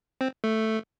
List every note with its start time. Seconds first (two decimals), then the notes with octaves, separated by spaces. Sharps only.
0.21 C4
0.44 A3